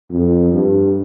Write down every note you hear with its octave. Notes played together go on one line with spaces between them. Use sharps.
F2
G2